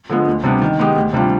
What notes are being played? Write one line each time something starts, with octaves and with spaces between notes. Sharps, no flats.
D3 F3 G#3 B3
D2
C3 G3 B3 D4
D#3
G#3 B3 D#4 G4
D2
C3 G3 D4 F4